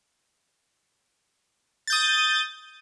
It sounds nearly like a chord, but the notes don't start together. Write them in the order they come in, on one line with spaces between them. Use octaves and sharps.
A6 G6 D#6